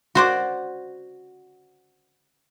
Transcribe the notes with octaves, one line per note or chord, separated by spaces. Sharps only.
F#4 C5 D5